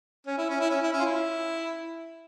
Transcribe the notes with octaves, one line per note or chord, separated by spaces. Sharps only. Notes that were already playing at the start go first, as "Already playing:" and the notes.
C#4
E4
C#4
E4
C#4
E4
C#4
F4
E4